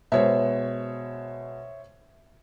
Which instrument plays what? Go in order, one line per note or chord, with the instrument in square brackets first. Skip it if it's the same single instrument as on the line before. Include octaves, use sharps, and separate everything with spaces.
[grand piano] B2 G#3 [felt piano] C5 C#5 E5